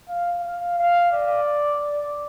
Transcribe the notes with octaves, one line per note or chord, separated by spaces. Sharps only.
F5
F5
F5
D5